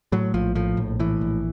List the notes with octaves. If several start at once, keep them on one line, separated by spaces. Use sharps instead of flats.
A2 F#3
A#1 F3
A2 F3
A#1
A2 E3
A#1